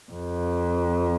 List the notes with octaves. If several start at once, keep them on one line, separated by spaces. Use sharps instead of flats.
F2